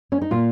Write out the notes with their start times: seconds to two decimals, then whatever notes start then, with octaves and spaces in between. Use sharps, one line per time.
0.12 C#4
0.21 D#4
0.31 A#2 F4